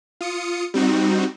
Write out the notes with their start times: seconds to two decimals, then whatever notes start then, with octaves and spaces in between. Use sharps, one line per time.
0.21 F4 D#6 C#7
0.74 G3 C4 D#4 F#4